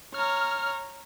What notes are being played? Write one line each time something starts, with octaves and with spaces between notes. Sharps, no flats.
C#5 A#5 F6